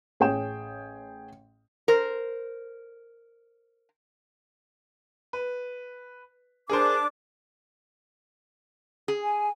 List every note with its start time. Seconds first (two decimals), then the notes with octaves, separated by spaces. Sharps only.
0.20 A1 G#4 C#5 G5 E7
1.88 A#4 C5
5.33 B4
6.70 D4 G#4 A#4 C5 D6
9.08 G#4
9.23 G#5